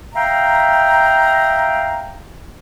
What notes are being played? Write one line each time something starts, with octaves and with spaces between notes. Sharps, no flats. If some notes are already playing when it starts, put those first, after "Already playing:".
E5 F5 G5 A#5